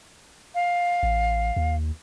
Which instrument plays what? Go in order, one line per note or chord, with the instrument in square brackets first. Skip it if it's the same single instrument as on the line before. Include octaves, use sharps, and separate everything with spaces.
[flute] F5
[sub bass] A1
D#2